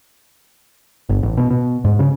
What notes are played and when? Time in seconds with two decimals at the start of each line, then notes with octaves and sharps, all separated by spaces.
1.09 G1
1.23 A1
1.38 B2
1.51 B2
1.85 G#2
1.99 C#3